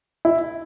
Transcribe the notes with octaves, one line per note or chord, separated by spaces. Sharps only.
E4